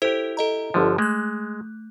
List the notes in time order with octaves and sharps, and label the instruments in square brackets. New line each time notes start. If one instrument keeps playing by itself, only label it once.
[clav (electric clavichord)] E4 G4 [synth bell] A4 C5
[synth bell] A4 D#5 A#5
[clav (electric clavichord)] G1 D3 F3
[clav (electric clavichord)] G#3 [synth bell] A3 F#6